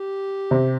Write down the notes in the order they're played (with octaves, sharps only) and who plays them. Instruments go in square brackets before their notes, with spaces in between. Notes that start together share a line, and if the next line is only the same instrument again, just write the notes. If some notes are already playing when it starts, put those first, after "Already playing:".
Already playing: [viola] G4
[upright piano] C3